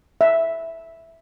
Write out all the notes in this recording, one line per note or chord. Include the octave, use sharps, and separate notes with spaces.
E5